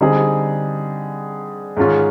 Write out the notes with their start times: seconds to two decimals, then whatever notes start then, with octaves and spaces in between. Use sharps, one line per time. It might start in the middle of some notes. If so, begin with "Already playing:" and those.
0.01 D3 G3 C4 D#4 G#4
1.77 G#2 D#3 G#3 C#4 F4